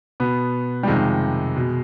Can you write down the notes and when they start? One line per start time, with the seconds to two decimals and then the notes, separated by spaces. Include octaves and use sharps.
0.20 B2 B3
0.83 G3
0.87 F2 C3 D#3 G#3
1.56 B2